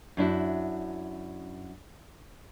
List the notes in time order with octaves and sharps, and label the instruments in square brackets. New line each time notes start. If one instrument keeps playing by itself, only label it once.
[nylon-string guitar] F#2 D4 E4 F#4